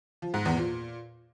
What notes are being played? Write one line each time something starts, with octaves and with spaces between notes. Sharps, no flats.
F3
G#2
E2
A#2